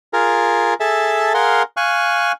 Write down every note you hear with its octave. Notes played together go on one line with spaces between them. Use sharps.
F4 G#4 A#4
G#4 A4 E5 A5
G#4 A#4 F5 F#5 C6
F5 G#5 C#6 F#6